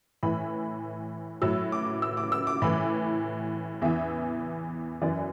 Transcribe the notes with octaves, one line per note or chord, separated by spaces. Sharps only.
A2 E3 B5
A2 F#3 E6
D6
E6
D6
E6
D6
A2 E3 B5
E2 E3 E5
F#2 E3 D5